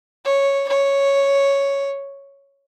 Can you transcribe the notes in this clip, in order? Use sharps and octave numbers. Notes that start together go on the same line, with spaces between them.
C#5
C#5